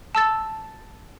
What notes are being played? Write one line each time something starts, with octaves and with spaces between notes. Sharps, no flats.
A5 E6 A6